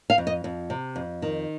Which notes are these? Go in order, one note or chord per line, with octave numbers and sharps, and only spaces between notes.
F5
F2
D#5
F2
C3
F2
D#3